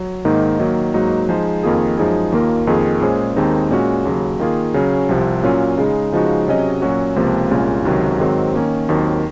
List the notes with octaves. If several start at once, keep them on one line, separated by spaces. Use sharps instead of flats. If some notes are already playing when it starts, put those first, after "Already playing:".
Already playing: F#3
G#2 D#3 A#3 D#4
D#3 F#3 A#3
G#2 F#3 A#3 D#4 F#4
F3 G#3 D#4 G#4 C5
F2 D#3 A#3 F4 G#4
F#2 F3 G#3 D#4 G#4
D#2 D#3 A#3 F4 A#4
F2 D#3 A#3 F4 G#4
A#2 G#3 C#4 G#4 C5
D#2 D#3 G#3 C4 D#4
A#2 G#3 C#4 F#4
D#2 C#3 F#3
D#3 A#3 F4 G#4
C#3 F#3 C#4
C2 C3 F3
A#2 F#3 C#4 F4
C#3 G#3 D#4
C#3 F3 G#3 D#4 F#4
C3 F#3 C#4 G#4 D#5
A#2 F#3 C#4 F#4
C#2 C3 F3 A#3
C2 A#2 G#3 C#4 F4
C#2 C3 D#3 F#3
G#2 D#3 F#3 C4
D#3 A#3 C#4
D#2 D#3 F#3 C4